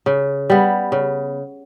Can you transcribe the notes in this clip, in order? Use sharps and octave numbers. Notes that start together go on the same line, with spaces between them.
C#3
G3 B3
C#3